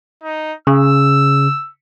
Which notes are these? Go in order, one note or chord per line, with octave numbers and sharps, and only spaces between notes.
D#4
C#3 E6